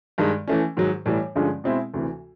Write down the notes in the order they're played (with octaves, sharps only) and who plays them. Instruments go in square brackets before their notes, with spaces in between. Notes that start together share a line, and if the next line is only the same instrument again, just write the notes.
[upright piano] G2 D#3 G#3
E3 A3 C#4
G#2 D#3 F#3
A2 E3 G3
G2 D3 F3 G#3 C#4
B2 G#3 C4 E4 G#4
D2 C3 E3